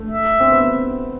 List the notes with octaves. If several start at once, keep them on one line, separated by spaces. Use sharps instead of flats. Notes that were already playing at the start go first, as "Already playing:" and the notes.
Already playing: A3
E5
C4
B3